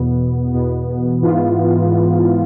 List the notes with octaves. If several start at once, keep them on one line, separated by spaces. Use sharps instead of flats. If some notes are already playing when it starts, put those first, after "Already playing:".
Already playing: E2 B2 B3
E2 B2 B3
G#2 E3 B3 F4